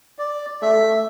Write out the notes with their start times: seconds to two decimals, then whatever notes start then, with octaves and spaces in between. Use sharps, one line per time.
0.19 D5
0.62 A3 E5